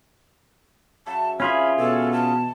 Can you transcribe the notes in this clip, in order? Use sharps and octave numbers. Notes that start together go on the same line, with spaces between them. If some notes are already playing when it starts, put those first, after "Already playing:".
C#3 F#3 E5 A5
E3 C4 C#4 F4 G#4 E5 B5
B2 A4 C#5 G#5
A5